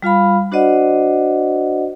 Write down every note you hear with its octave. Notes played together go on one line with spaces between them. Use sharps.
G3 F4 F5 B5
D4 F#4 C5 D5 D#5 F#5